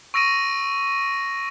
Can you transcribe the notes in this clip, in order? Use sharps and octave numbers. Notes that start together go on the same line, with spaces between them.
C#6 E6 A#6 D7 D#7